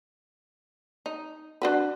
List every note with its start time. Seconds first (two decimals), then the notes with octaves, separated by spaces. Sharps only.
1.06 D#4
1.62 D4 F#4 B4